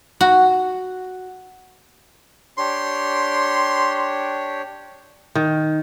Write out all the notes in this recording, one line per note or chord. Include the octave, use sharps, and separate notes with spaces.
F#4
D4 G4 C#5 C6
D#3